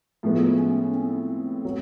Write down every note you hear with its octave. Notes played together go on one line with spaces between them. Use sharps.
A2 F3 G#3 B3
C#4
C4
F#3